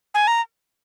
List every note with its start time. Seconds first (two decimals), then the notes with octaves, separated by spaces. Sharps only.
0.14 G#5
0.27 A#5